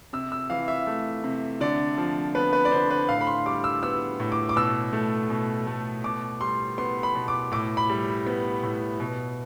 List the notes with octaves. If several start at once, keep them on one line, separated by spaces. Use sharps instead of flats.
C3 E6
E6
E3 F5
E5
A3
C3
D3 D5
F3
B3 B4
B4
D5
D3 C5
B4
A2 F5
B5
C6
G3 D6
E6
B3 E6
A2
D6
D6
B2 E6
A3
B2
A3
B2 D6
G3 C6
B3 C6
B5
B2
D6
A2 D6
B5
G3
B3
A2
B2